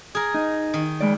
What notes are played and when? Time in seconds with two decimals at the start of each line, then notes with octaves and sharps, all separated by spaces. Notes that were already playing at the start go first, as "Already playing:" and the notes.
0.15 G#4 A#4
0.34 D#4
0.74 D#3
1.01 G#3 D5